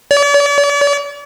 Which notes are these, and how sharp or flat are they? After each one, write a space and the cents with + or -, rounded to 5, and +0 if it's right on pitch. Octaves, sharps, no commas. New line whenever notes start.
D5 -45